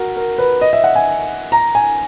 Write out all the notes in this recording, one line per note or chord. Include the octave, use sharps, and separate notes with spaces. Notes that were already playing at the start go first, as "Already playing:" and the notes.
Already playing: F#4 A#4
A#4
B4
D#5
E5
F#5
G#5
A#5
G#5